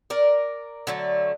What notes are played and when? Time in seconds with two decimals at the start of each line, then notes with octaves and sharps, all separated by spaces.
0.10 A#4 D5
0.87 D3 F#3 A3